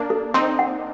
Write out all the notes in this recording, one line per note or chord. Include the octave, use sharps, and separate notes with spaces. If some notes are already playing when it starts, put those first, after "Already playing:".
Already playing: A#3 D4
A4
C4 D#4 C6
F#5